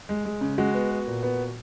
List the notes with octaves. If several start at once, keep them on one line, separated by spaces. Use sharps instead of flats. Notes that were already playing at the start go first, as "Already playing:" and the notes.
G#3
G#3
C#3
G#3 F#4
B3
B3
A#2
B3